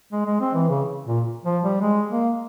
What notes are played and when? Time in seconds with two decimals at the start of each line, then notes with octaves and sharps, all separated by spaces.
0.12 G#3
0.26 G#3
0.41 C4
0.54 E3
0.69 C#3
1.07 A#2
1.45 F3
1.64 G3
1.81 G#3
2.09 A#3